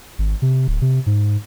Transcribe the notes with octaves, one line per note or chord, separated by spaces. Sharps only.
G#1
C3
D1
C3
G#2